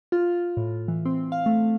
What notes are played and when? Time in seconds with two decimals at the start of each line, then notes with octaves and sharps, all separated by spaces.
0.12 F4
0.57 A2
0.88 E3
1.05 C4
1.32 F5
1.46 A3